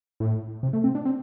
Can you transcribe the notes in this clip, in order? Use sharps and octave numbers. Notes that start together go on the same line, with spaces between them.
A2
C3
A3
C4
D4
C4